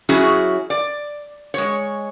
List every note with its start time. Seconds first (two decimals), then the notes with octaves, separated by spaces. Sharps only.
0.09 F#3 C#4 E4 F#4 G#4
0.70 D5
1.54 G#3 C#5